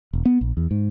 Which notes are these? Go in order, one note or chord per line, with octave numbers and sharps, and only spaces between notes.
E1
B3
A#1
E2
G#2